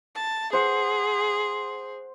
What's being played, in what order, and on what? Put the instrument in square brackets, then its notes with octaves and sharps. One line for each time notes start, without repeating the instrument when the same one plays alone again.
[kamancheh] A5
[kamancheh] G#4 [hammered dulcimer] C5 F#5